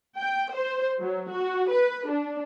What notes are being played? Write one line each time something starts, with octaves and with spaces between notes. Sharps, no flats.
G5
C5
F#3
F#4
B4
D4